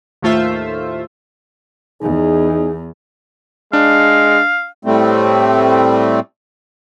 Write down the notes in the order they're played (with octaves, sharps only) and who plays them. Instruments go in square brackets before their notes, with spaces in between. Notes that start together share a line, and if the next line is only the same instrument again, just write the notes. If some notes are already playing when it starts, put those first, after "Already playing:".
[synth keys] D#2 A2 A3 F4 C5 E5
[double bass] E2 [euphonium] D#4 [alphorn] G#4
[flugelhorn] G#3 [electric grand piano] D4 [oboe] F5
[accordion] A2 G3 A3 C4